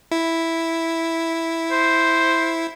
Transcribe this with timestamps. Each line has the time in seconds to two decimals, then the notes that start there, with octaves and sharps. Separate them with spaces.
0.11 E4
1.71 C5